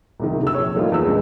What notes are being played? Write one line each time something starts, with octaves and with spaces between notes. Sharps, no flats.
C2 C3 D#3
D2 E6
A#1 C#5
D#3 G3 A3 A#3 D#4 F4
E2 E6
C#2 G2 A#2